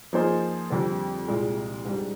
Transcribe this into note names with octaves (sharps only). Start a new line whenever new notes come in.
F3 A#3 D#4 G#4 C5
F2 D3 G3 C4
C2 A#2 G#3
G#2 G3 D4